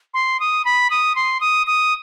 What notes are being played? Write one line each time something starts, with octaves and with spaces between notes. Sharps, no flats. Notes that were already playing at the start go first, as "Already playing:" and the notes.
C6
D#6
B5
D#6
C6
D#6
D#6